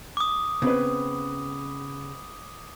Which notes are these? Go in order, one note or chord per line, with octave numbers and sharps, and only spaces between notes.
D6 D#6
C#3 B3 C4 B4